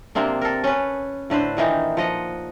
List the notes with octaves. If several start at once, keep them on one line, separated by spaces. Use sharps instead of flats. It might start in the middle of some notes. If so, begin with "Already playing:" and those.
C3 A#3 C4 D4
A4 A#4
C#4 B4
A2 D3 B4 C5
A#2 D#3 E3 D#4
F3 D#5 F#5